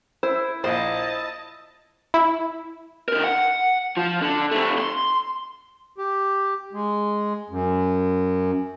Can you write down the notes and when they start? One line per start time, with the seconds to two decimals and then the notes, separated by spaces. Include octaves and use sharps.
0.23 E4 C5
0.64 A#1 C5 D#5 A5
2.14 E4
3.08 D3 A#4
3.24 F#5
3.97 F3
4.22 D3
4.52 F2 A3
4.78 C6
5.98 G4
6.73 G#3
7.50 F#2